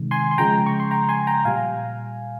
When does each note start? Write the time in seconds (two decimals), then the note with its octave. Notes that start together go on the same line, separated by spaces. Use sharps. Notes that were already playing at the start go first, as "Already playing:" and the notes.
Already playing: C3 D#3 G#3
0.11 G#5 C6
0.31 C6
0.38 C#3 F3 G#3 G5 A#5
0.66 C#6
0.80 C6
0.91 G5 A#5
1.09 G#5 C6
1.27 G5 A#5
1.45 A#2 G3 F5 G#5